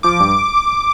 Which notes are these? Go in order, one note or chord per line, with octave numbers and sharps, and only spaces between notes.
F3 D6
G2